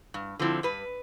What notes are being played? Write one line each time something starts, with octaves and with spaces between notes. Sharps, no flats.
G2
D3 F3 C4 E4
G2 B4